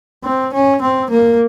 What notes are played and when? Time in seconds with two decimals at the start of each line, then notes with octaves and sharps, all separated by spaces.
0.24 C4
0.53 C#4
0.82 C4
1.10 A#3